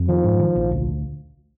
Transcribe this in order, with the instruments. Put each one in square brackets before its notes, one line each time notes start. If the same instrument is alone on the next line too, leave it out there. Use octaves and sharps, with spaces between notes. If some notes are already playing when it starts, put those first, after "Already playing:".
Already playing: [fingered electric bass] F2
[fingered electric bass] D#3 [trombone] F3
[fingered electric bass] G#2
D#3
A#1
D2